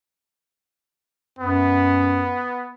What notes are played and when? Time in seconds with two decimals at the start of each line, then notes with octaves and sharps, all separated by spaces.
1.39 F#2 B3